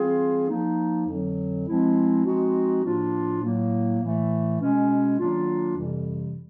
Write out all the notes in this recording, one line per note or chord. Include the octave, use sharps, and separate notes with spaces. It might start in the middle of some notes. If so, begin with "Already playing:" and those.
Already playing: E3 G3 C4 F4 G#4
F3 A#3 D#4
F2 D3 F#3
F3 G#3 C4 E4
F3 G#3 C4 D#4 F#4
A2 F3 A#3 D4 F4
A2 F#3 A#3
A2 E3 A3
B2 G#3 C#4
D#3 F#3 A#3 D4 F4
F2 C3 E3 G3